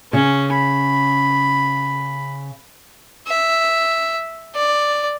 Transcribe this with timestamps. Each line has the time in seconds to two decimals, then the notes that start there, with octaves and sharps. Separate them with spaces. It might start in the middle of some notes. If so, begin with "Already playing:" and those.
0.13 C#3 C#4
0.54 B5
3.27 E5
4.55 D5